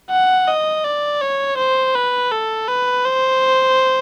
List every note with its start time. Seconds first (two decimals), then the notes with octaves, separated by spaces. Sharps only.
0.11 F#5
0.48 D#5
0.84 D5
1.21 C#5
1.58 C5
1.95 B4
2.31 A4
2.68 B4
3.05 C5